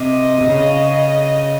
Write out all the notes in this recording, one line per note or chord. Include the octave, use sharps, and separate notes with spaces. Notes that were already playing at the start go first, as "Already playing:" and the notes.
Already playing: C3 D#5
C3
C#3